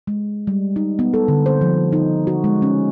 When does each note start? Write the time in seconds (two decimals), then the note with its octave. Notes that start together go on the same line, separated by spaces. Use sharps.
0.07 G#3
0.47 G3
0.76 D#4
0.99 B3
1.14 A4
1.28 D3
1.46 C5
1.61 F3
1.92 D#4
2.27 F#4
2.44 G#3
2.62 C#4